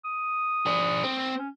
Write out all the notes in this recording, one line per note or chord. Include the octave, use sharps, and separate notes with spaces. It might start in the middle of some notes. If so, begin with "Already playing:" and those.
D#6
D4 G#4
C4
C#4